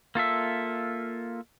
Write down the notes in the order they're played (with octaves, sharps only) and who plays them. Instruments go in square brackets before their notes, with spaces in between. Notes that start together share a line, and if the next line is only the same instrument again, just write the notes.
[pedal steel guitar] A#3 F4 A4 E5